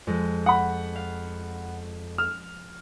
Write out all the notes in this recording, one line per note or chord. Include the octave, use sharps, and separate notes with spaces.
F2 G#3
F#5 B5
F5
E6 F6